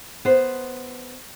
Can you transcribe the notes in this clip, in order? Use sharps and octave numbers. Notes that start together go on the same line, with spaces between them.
B3 C5